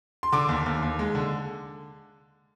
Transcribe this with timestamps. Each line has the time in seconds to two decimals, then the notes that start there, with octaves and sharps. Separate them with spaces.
0.23 C6
0.32 D3 D6
0.49 D#2
0.66 D#2
0.82 D#2
0.99 G#3
1.15 D3